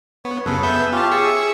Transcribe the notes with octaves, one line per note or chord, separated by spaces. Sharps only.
B3 C#5
F#2 C#3 G#4 A4 B4
B3 E5 G6
C#4 F4 G4 A5
G#4 C#6 E6
E5